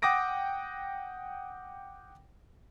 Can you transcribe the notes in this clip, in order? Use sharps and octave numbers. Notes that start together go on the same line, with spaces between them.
F#5 G5 D6 D#6 A#6 D7